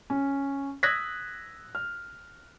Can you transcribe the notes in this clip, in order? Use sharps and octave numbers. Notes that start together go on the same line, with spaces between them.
C#4
D#6 E6 F#6 G#6 A#6 B6
F6